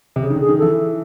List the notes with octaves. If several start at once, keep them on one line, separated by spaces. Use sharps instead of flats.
C3
C#3 G#4
D#3
D3 G#4
D#3
E3 A4